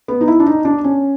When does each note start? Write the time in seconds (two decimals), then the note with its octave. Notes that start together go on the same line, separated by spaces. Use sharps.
0.08 B3
0.21 D#4
0.28 E4
0.40 D4
0.46 D#4
0.65 D4
0.84 C#4